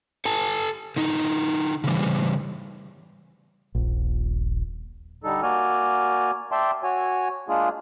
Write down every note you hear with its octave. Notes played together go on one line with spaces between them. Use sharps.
A4 G#5 A5
D3 D#4
C#3 E3 G3
D#1 A#1
D3 G3 D#4 A4
A#3 F#4 D5 G#5 F6
D5 E5 G5 A5 C6
F#4 C#5 G#5
G#3 A#3 D4 F4 G#4